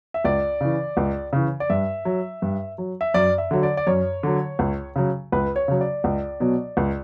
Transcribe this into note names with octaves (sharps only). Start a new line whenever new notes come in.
E5
C#2 D5
C#3 E3
C#2
C#3 E3
D5
G2 E5
F#3
G2
F#3
E5
F#2 D5
E5
D3 F#3
D5
D5
F#2 C#5
D3 F#3
C#2
C#3 F#3
C#2 B4
C#5
C#3 F#3
D5
C#2
B2 F#3
C#2